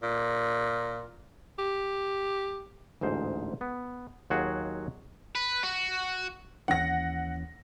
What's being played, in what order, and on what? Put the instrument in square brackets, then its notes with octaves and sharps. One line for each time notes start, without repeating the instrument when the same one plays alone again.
[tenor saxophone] A#2
G4
[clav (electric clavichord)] A1 D2 G#2 C5
B3
D#2 F#3 F4 F#4 G#4
[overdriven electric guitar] B4
F#4
[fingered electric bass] D#2 E3 C#4 [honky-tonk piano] F#5 A#6